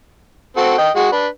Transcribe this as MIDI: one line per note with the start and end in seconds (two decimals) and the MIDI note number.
0.57 0.74 60
0.57 0.74 66
0.57 0.74 69
0.78 0.90 75
0.78 0.90 79
0.96 1.09 56
0.96 1.09 66
1.12 1.27 62
1.12 1.27 71